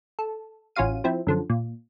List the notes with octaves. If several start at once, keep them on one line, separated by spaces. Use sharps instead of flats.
A4
A1 C#4 F4 F#4 F5 D#7
F3 C4 E4
F#2 D3 F3
A#2